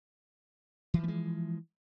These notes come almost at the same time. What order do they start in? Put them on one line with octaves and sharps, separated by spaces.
E3 F3 A3 G#3